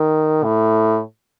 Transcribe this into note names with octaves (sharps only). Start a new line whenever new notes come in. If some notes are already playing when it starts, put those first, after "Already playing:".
Already playing: D#3
A2